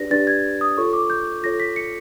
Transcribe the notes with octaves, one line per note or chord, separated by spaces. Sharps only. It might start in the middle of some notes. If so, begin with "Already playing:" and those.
Already playing: D4 G4 B4 D5 A#6
D4 G4 B4 D5 A6
G#6
D#6
F4 A4 C#5 C#6
D6
G6
F4 A4 C#5 A#6
B6
C#7